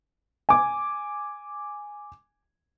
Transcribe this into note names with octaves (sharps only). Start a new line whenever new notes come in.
G#5 D6